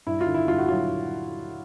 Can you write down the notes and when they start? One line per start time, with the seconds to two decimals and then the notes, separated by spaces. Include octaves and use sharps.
0.06 G2 E4
0.21 F4
0.27 D3
0.34 E4
0.48 G2 F4
0.58 F#4
0.69 F#3 F4